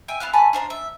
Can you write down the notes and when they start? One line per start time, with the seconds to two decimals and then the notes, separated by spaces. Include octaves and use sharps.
0.08 E5 G5 G#5
0.20 B3 E4 F5 F#6
0.33 A3 G#5 A5 B5
0.53 D4 C5 E5 A#5
0.70 E5